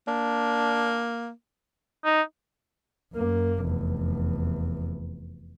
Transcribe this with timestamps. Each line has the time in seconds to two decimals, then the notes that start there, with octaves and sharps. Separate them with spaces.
0.08 A#3 D4
2.05 D#4
3.13 F#2 A#3
3.62 F1 E2